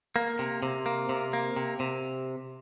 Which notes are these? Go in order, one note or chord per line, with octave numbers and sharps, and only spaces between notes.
A#3
C3
C3
A#3
C3
A#3
C3
C3